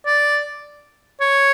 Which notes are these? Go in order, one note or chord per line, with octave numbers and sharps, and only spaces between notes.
D5
C#5